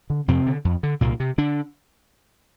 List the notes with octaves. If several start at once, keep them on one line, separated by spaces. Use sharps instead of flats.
D3
F2 C3 C4
D3
F2
D3
C2 A#2 A#3
C3
D3 D4